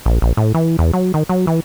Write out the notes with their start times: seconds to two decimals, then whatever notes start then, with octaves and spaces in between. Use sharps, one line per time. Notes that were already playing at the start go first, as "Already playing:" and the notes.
0.06 A#1
0.22 A#1
0.37 A2
0.54 E3
0.79 E2
0.93 F#3
1.14 D#3
1.29 F#3
1.47 E3